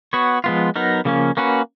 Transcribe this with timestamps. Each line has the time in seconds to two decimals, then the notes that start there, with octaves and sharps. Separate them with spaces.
0.13 B3 F#4 C#5
0.44 F3 G#3 B3 F4
0.76 F#3 B3 D#4 A#4
1.05 C#3 F3 A#3 C#4
1.37 A#3 C#4 F#4 B4